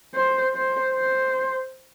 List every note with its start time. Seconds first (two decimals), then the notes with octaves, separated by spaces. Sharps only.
0.15 C5
0.54 C5
0.93 C5